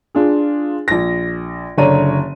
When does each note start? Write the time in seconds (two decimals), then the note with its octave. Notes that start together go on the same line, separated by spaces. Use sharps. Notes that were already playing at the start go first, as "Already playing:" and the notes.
0.15 D4 F4 G#4
0.88 A#1 A#6
1.78 F#1 D3 C#5 D5 A#5 D#7